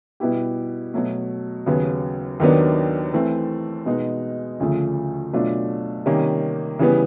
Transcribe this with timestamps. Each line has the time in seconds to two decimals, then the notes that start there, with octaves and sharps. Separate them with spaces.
0.20 B2 G3 B3 E4 G4
0.94 B2 F#3 A3
1.66 D#2 C#3 F#3 B3
2.40 D#2 D#3 F#3 B3 D4
3.13 E3 A3 C4
3.86 B2 G#3 B3 D#4
4.60 D2 C#3 F3 A3
5.33 B2 F#3 A3 D4 F4
6.06 C3 D#3 G3 A#3 C#4
6.79 C#3 E3 G3 B3